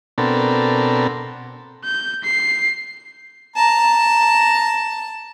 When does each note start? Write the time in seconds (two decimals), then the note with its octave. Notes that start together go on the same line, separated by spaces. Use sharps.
0.18 B2 B3 C4 D4 A4 A#4
1.84 G6
2.24 C7
3.56 A5 A#5